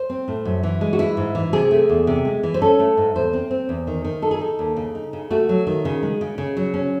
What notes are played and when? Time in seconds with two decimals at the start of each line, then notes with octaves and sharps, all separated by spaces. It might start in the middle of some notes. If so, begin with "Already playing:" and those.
Already playing: C5
0.10 C4
0.28 A2
0.45 F#2
0.63 E3
0.81 G#3
0.93 F#4
0.99 E3 E4
1.17 G#2
1.35 E3
1.53 C3 G#4
1.71 A3
1.89 E2
2.07 C3
2.25 G#3
2.43 E3
2.54 C5
2.61 C#4 A4
2.79 A3
2.97 G#2
3.15 E2 C5
3.33 C4
3.51 C4
3.69 E2
3.87 D#3
4.05 D#3
4.22 D#4 A4
4.31 G#4
4.38 D#4 A4
4.59 D#2
4.77 C#3
4.95 D#4
5.13 C#3
5.30 A3 F#4
5.49 F#3
5.67 D#3
5.85 C#3
6.03 G#3
6.21 C#3
6.38 C#3
6.57 F#3
6.74 C#4